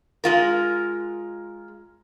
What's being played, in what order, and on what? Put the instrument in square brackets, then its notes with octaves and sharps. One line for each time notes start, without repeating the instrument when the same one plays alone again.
[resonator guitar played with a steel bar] G#3 F4 A#4